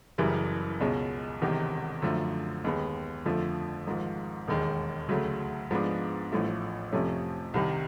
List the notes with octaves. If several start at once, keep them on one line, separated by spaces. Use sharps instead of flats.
F#1 F#2 C#3 E3 G3
C#2 B2 G#3 C#4
E1 E2 C3 D#3
F#2 D3 F3 A3
D#2 D#3 G#3 B3
F2 D3 F3 A3
G#1 G#2 F3
E1 D#2 D#3 G#3
D2 C#3 F#3 A3
G#2 F3 G#3 B3 D4
A1 A2 F3 A3
F2 C3 F3 A3 C#4
C2 C3 D#3